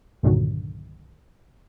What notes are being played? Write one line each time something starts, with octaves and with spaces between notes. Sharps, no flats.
C2 G2 A#2 D3 D#3 F#3